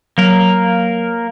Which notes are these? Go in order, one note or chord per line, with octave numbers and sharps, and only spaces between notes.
F#3 A#3 A#4